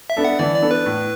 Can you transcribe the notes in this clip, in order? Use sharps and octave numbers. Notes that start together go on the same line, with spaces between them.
E5
B3 D4 A4
F#5
E3 D5
D5
B3 D4 A4
B4
A2